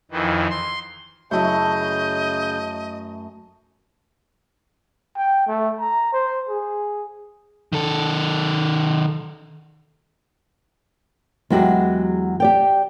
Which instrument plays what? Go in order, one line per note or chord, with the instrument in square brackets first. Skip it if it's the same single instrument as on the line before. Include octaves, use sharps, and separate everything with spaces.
[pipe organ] F2 D#3 E3
C6
[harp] F#2 E4 [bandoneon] C#3 G6 [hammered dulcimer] A3 A5 [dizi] D#5
[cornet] G5
A3
A#5
C5
G#4
[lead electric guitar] D#3 A4
[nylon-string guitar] E2 F#3 G#3 F#4 G4 F#5
G4 D5 G5